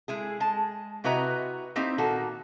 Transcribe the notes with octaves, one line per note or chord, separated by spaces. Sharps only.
G#3 E4 G#4
G#3 A5
C3 E4 F#4 B4 D#5 A#5
A#3 C4 D#4 E4 G4
A#2 D#3 A#3 F#4 A4